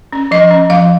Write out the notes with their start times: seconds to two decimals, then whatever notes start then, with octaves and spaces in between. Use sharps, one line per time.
0.13 C#4
0.31 F3 D#5
0.51 C#4
0.70 F3 F5